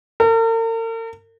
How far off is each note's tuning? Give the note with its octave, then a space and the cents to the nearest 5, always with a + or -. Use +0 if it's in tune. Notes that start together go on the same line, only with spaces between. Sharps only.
A#4 -45